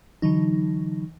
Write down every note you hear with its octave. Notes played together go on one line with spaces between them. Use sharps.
D3 E3 F#3 D#4